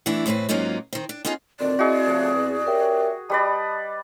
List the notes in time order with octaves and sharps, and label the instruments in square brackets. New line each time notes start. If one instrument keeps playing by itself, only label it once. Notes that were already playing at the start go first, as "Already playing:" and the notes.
[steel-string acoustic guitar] E3 A3 B3 D4 E4
E2 A2 C4 G#4 B4
G#2 F#3 A#3 C#4 D#4 F4
D#3 C4
D4
B3 C#4 D#4 F4 G#4
[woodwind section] D2 A#2 D#3 [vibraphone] C4 [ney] D5
[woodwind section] E4 D#5 [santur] F#4 G#4
[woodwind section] C#3 F3 A3
E2
[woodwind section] C#4 G4 E5 [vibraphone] A#4 G5
[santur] G3 B4 D5 [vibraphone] D#5 [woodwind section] A5 D#6